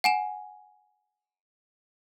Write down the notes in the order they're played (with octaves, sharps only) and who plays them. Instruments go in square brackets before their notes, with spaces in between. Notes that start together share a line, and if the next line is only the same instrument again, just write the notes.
[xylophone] F#5 G#5 E7